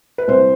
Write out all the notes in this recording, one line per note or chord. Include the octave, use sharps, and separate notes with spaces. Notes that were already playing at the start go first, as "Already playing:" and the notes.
B4
C2 C5